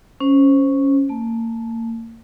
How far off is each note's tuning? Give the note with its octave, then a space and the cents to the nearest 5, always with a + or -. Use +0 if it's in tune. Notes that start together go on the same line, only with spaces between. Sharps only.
C#4 +0 C5 +0
A#3 -35 A5 -25